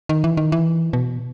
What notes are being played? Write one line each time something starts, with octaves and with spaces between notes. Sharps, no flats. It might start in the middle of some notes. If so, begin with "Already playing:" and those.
D#3
E3
D#3
E3
B2